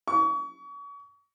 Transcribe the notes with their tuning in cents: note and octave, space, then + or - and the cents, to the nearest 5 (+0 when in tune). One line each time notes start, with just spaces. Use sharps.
C#6 +35